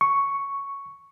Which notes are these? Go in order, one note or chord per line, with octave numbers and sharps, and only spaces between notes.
C#6